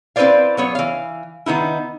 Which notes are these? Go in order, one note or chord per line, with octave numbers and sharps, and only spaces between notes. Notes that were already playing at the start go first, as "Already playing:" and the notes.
C4 E4 B4 C5 D5 F5
F#3 B3 C#5
E3 F5
D#3 B3 D#4 E4